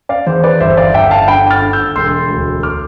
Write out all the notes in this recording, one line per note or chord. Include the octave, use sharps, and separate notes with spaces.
D5 F5
E2 C5
B4 D5
G1 C5 E5
D5 F5
G1 E5 G5
F5 A5
D3 G5 B5
F6 A6
D3
E6 G6
E1 C6 E6
D2
D6 F6